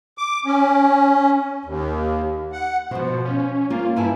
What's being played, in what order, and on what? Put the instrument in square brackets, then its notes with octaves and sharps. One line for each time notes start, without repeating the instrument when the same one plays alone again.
[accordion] D6
C#4
D#2
F#5
[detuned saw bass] B2 [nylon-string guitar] F3 C5
[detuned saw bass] C#4
[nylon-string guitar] A#3 [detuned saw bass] F4
[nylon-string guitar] G2 G#5 A5 [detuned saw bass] E4